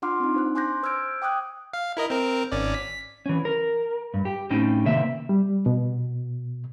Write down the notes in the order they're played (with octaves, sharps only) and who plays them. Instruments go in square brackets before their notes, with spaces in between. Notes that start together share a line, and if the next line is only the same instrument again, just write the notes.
[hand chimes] D4 F4 F#5 C6 D6 F6
C4 D#4
D4 C5 F#6
G#5 C6 D6 F#6 G6 A#6
C5 E6 F6 G6 G#6 D7
G5 D6 D#6 F#6 G#6
[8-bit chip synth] F5
E4 A#4 D#5
C4 A#4
G#1 C#4 D5
B6
[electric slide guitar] E3 C#4
A#4
G2
G4
A2 C4 C#4 D#4 C5 G5
C3 D#3 A#3 E5
[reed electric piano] G3
B2